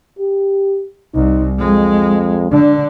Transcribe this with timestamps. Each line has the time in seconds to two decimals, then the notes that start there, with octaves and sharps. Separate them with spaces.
0.19 G4
1.15 C2 D#4
1.59 F2 G#3
2.52 D3 D4